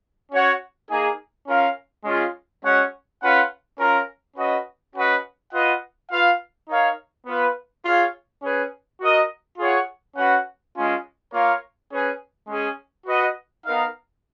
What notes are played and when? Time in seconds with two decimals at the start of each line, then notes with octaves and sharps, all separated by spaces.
0.31 C#4 F#4 C#5 F#5
0.89 A#3 D#4 G#4
1.47 C#4 F4 A#4 F5
2.05 G#3 C#4 F4 G#4
2.63 G#3 C#4 F#4 C#5 F#5
3.21 C#4 F4 B4 F#5
3.79 C#4 F4 A#4
4.37 C#4 F#4 B4 D#5
4.95 C#4 F#4 B4 D#5 F#5
5.53 F4 B4 D#5 F#5
6.10 F4 B4 F5
6.69 D#4 A#4 C#5 F5
7.26 B3 F4 B4
7.85 F4 G#4 C#5 F5
8.42 C#4 G#4 B4
9.01 F#4 A#4 D#5
9.58 F4 G#4 C#5 F#5
10.17 C#4 F#4 B4 F#5
10.75 G#3 C#4 F4
11.33 A#3 F4 A#4 C#5 F5
11.90 C#4 G#4 B4
12.48 G#3 C#4 G#4
13.06 F#4 B4 D#5 F#5
13.64 B3 D#4 A#4 F5